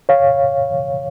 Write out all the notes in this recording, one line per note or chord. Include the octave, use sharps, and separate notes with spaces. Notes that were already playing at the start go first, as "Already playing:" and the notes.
C#5 F5